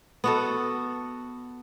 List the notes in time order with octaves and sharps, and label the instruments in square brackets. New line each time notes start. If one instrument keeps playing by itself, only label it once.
[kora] B3 F#4 A4